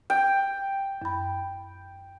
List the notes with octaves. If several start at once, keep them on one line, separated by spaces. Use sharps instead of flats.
G5
F#2 B5